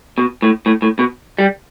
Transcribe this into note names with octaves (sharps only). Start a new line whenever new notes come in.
B2
A2
A2
A2
B2
G3